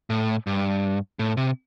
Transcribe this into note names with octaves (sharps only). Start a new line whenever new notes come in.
A2
G2
A2
C3